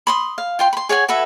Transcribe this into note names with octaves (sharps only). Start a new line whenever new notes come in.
B5 C6 D#6
F5
F4 G5 C6
B5 C6
G#4 C#5 F#5 G#5
F#4 A4 B4 E5